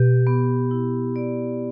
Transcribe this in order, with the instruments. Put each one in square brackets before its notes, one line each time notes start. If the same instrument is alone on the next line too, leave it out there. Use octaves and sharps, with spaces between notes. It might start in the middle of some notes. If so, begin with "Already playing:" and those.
Already playing: [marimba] B2 [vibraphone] G4
[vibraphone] B3
E4
D5